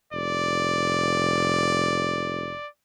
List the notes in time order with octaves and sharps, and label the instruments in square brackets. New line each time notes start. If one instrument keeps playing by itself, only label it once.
[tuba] F1 [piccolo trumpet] D5